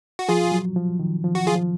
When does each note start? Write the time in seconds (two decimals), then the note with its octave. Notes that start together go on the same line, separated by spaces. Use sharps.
0.19 F#4
0.29 F3 F4 G#4
0.52 F#3
0.76 F3
0.99 D#3
1.24 F3
1.35 F#4
1.47 F4 G#4
1.55 F3